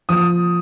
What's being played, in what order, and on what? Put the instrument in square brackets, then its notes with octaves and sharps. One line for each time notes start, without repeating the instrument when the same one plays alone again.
[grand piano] F3 D#6